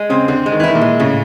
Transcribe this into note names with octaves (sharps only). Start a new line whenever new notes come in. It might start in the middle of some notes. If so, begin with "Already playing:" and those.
Already playing: G#3
C#3 C4
D3 C4
G#3
D#3
E3
D#3 E4
A#2
G#3
A2 C#3